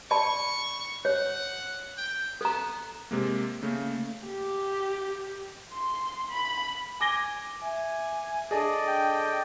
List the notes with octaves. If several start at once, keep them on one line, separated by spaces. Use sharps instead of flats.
D5 A5 B5 C#6
C#5 F#5
G5
B3 A4 A#5
C3 G#3 A#3
C#3 A3 A#3
G4
C6
B5
G#5 D6 A#6 G7
E5 G#5
D4 G#4 A4 D5 D#5 A5
G5